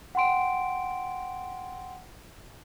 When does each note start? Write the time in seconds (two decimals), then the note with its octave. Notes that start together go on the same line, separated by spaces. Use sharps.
0.15 F#5 G5 C6 D7